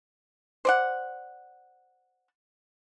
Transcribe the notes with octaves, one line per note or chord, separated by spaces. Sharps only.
C5 D5 F#5